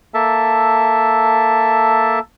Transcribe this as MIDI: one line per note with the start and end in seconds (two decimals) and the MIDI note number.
0.14 2.19 58
0.14 2.19 69
0.14 2.19 76
0.14 2.19 81